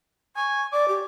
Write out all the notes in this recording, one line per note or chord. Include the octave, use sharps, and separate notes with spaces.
G#5 C#6
D5 D6
G4